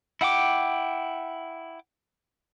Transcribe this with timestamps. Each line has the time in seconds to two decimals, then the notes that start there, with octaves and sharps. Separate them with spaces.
0.21 E4 F#5 G5 D6